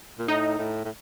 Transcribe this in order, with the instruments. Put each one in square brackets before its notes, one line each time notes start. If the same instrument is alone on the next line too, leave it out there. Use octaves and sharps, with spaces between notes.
[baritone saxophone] A#2
[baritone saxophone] A2 [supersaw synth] D#4
[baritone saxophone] A2
A2